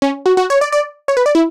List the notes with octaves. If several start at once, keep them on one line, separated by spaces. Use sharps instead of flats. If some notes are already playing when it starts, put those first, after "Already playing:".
C#4
F#4
F#4
C#5
D5
D5
C#5
B4
D5
E4